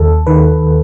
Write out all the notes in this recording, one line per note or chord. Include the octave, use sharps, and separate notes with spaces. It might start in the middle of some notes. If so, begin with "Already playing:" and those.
Already playing: D#2 A4
D#3 B4